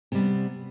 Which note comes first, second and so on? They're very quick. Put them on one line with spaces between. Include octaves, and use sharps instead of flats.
C3 G3 B3